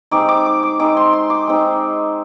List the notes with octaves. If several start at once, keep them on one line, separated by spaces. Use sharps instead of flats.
G#3 C4 D#4 D6
D6
D6
D6
G#3 C4 D#4 D6
C6
C6
D6
G#3 C4 D#4